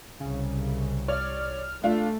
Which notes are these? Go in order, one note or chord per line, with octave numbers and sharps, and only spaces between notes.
C2 C#3
C#5 D5 F6
A3 D4 F4